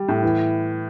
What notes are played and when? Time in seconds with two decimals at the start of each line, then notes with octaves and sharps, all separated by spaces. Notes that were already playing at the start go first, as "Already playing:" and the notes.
Already playing: G3
0.09 A2
0.22 E3